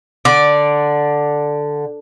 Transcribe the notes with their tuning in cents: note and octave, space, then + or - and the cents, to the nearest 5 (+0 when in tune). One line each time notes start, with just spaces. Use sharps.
D3 +0 D5 +0